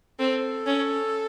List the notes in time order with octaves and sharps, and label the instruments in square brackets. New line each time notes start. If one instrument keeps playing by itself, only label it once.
[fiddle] C4 [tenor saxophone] A4
[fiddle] C#4